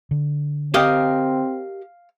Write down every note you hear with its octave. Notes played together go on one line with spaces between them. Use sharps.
D3
C4 G4 A#4 D#5 F5